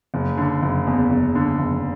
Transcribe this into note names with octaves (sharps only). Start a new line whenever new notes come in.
F#1
D3
F#1
E2
F#1
D3
F#1